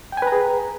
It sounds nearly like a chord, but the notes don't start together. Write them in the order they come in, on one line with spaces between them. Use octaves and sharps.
G5 G#5 B4 A#5 G#4